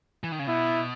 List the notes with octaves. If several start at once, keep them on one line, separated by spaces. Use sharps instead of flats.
E3
D#3
C#3
B2 E4